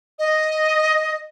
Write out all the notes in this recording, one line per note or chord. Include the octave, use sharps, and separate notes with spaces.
D#5